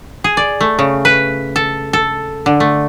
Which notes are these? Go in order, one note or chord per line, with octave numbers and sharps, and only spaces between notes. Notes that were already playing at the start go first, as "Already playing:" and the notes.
G#4
D5
A3
C#3
B4
A4
A4
D3
A3